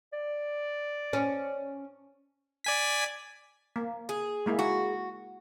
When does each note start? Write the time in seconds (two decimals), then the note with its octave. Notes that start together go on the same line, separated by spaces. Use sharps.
0.13 D5
1.13 C#4
2.64 D5 G#5 B6
3.76 A#3
4.09 G#4
4.46 G#3 A#3 E4
4.59 F#4